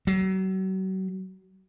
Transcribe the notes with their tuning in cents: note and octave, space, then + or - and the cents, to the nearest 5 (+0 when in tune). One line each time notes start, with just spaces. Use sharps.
F#3 +40